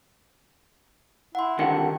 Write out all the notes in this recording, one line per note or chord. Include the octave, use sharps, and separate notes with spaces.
E4 F#5 C6
C2 D3 D#3 F#5 G5